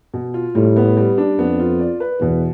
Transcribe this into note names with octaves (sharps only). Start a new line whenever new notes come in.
B2
F4
A2 G3
B3
G3
D4
F2 B3
F4
D5
B4
E2 B2